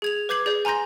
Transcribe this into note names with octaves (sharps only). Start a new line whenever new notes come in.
G#4 G#6 F7
B4 D6 G6 G#6 C7 F#7
G#4 D5 G6
G#5 A#5 C6 G6 A#6